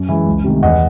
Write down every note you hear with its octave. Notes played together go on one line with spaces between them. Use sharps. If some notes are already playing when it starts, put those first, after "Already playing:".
Already playing: F#2
E3 G#3
C#2
C3 D#3 A3
E2 D#5 F#5